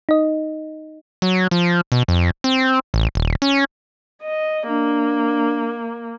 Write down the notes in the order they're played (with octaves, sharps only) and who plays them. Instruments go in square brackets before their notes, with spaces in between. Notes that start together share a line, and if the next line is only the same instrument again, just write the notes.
[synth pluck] D#4 D#5
[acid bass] F#3
F3
B2
F2
C4
A1
D#1
C#4
[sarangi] D#5
[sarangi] A#3 [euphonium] D4